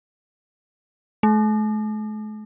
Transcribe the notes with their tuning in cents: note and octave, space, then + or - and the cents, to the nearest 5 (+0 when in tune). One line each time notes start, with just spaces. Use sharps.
A3 -45